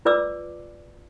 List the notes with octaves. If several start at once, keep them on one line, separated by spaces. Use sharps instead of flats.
F4 B4 D5 D6 E6